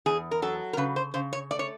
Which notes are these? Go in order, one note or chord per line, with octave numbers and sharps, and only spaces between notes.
E2 G#4
A#4
F#3 A4
A#4
C#3 B4
C5
C#3 C5
C#5
A3 D5
C#5